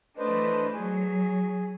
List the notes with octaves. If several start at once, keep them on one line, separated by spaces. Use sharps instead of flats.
E3 A3 D4 B4 C5 D#5
F#3 G#4 G#5